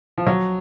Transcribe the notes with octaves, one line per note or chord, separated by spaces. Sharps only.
F3
F#3